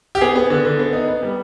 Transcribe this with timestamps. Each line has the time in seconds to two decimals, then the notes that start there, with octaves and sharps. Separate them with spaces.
0.15 G4
0.21 B3 G#4
0.36 B3
0.50 D3
0.65 D3
0.79 B3
0.93 D#4
1.08 B3
1.23 G3